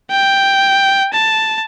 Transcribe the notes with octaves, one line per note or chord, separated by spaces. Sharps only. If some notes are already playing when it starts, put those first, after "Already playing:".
G5
A5